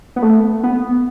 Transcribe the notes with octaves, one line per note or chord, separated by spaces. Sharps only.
B3
A3
B3